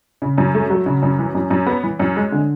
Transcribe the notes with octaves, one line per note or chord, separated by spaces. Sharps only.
C#3
F#2
A3
F#3
C#3
F#2
E3
F#2
F#2
B3
E3
F#2
G#3
D3